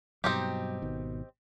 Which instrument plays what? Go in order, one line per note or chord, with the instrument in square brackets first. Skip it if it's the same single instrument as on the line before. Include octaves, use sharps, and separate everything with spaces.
[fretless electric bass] G2 B2 F#3 [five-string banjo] C4 D#4 G4
[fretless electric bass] G#1 B2 D#3